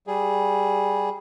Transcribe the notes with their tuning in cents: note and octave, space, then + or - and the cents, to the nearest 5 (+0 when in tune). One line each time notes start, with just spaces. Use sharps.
G3 +0 G#4 +0